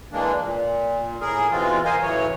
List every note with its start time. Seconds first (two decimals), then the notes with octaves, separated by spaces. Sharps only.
0.12 E3 G#3 A#3 D4
0.41 A#2
1.21 A2 G#4 A#4
1.51 B2 E3 G#3 C4 F4
1.85 A#4 C5 D#5 F5 G#5
2.02 A2 C#3 E3 F#3 C#5